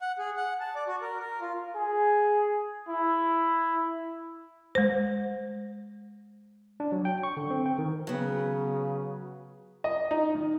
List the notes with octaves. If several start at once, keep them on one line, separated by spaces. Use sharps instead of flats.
F#5
G#4
F#5
A5
D5
F#4
A#4
A#4
F4
G#4
E4
G#3 C5
D4
F#3
G5
C#6
D3
C4
G5
D#3
C#3 F#3 B3
D#5
D#4
D#3